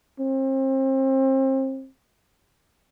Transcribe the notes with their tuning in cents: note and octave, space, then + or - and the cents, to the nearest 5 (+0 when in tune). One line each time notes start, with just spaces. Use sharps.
C4 +35